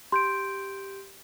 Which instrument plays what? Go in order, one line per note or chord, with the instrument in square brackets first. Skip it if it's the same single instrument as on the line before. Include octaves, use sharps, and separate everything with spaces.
[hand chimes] G4 G6 D7 [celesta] C6